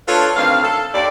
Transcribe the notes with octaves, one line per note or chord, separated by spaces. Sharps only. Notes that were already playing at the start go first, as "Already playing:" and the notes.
A3 D4 F4 A4 B4 C#5
D2 D#3 C4 F5
A4
D#2 D5